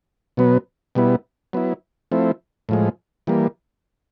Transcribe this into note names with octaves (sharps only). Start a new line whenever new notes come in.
B2 F#3 B3
B2 G3 B3 E4
F#3 B3 E4
F3 A3 C4 E4
A2 F3 G#3
E3 G3 A#3